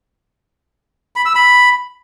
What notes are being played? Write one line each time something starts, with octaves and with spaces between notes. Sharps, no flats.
B5
E6
B5